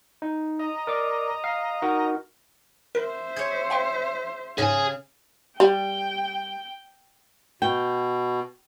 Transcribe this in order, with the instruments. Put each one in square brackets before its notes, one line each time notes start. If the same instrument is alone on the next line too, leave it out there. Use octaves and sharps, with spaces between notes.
[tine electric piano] D#4
[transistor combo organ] D#5 A#5
[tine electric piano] A#4 D5 D6
F5
D#4 F#4 A#4
[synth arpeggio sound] A#4 [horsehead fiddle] C5 E5
[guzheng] G#4 C#5 [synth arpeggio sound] G6
[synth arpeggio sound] F5 G5 C6
[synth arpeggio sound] G#2 A#6 [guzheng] C#3 [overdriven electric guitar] G#4 G#5
[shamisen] G3 [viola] G5
[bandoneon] B2 [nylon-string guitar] G5